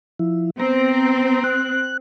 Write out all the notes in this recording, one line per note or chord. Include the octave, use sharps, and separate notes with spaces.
F3 E4
B3 C4 A#5
F#6